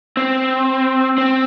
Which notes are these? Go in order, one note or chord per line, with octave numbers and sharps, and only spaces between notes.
C4
C4